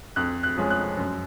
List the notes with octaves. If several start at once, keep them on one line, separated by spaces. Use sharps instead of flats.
F2 F#6
F#6
F3 G#3 C#4
F#6
F#2